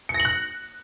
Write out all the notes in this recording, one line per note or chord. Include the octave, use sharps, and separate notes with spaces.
C#7
A#6
F#7
F#6